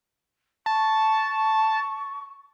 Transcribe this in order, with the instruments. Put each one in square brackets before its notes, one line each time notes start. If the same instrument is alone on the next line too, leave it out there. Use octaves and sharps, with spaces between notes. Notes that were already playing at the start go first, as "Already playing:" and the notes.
[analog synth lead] A5 [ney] C#6